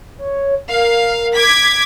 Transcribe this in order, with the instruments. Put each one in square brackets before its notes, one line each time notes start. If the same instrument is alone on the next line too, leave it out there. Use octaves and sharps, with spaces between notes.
[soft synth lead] C#5
[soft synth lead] A#4 [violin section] F5
[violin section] D6 G#6 B6